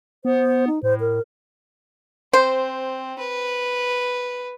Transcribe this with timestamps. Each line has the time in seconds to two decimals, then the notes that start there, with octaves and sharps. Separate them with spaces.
0.25 B3 C5
0.67 D#4
0.83 A2 C5
1.00 A#4
2.33 C4 C5
3.19 B4